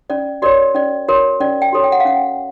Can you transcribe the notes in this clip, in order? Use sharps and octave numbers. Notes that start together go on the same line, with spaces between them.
C#4 D5
F#4 A#4 C#5 D5
C#4 D5
F#4 A#4 C#5
C#4 D5
G5
F#4 A4 C#5
G5
F#5
F5
C#4 F#5